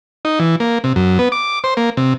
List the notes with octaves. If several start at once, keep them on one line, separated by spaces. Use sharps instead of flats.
D#4
E3
A#3
C3
F#2
B3
D6
C5
A#3
C3